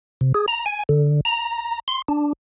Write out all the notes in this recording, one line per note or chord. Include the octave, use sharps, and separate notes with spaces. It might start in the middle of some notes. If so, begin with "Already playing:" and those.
C3
G#4
A#5
G#5
D3
A#5
C6
D4